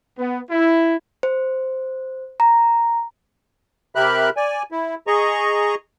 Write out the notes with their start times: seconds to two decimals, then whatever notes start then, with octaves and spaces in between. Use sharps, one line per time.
0.18 B3
0.50 E4
1.23 C5
2.40 A#5
3.95 C3 G4 A#4 E5 B5 F#6
4.37 D5 G#5
4.72 E4
5.07 G#4 D#5 A#5 C#6